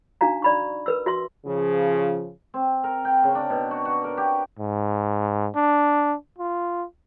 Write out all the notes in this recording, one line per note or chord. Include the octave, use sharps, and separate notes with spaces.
D4 D#4 F#4 F5 A#5
D5 B5 C#6
A#4 B4 E6
F#4 E5 C6
C#3 F3
C4
A#4
G5
C#3
D4
B2
F#4
F#4
A#4
G4
G#2
D4
F4